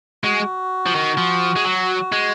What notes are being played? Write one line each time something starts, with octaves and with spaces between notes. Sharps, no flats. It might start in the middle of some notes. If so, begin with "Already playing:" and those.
G#3 F#4
F3
D#3
F3
G#3
F#3
G#3